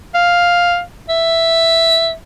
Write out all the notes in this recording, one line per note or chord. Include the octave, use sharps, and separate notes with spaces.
F5
E5